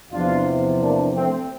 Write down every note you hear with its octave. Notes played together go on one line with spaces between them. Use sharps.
E2 C3 F3 D4 F4
A#3 D4
A3 C4